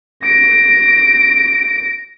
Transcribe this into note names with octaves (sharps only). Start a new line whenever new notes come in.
A#6 D7